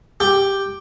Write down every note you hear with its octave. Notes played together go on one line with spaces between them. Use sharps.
G4